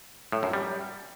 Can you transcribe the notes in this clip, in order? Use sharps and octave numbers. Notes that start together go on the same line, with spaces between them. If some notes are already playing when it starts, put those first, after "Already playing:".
A2
F#2
G3